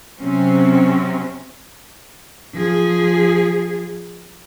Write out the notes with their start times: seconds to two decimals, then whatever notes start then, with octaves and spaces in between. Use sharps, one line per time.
0.20 C3 F#3 C4 C#4
2.54 F3 G#4